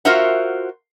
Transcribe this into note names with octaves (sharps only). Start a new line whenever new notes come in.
F4 F#4 A#4 C5 E5 F#5